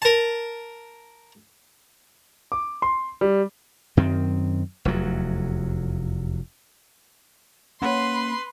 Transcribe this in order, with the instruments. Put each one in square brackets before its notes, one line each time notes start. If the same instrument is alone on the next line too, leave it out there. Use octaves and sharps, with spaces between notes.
[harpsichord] A#4 A5
[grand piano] D6
C6
G3
[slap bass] F#2 D#3 C4
F1 E2 F#3
[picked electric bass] A#3 C#4 [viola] B4 [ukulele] C#5 F#5 [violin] C6